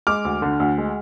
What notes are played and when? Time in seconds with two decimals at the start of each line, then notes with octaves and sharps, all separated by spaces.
0.07 G#3 D6 F6
0.25 D2
0.42 D3
0.60 D2
0.78 G#3